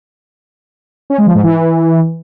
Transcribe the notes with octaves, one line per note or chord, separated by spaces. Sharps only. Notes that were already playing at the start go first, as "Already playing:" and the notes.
C#4
G#3
F3
G#2
E3